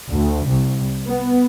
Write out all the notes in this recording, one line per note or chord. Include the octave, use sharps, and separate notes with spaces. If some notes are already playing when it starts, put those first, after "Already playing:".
D2
C2
B3